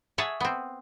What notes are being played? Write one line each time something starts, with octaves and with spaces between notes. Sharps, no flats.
G#4 C#5 E5 F#5 A5
B3 C4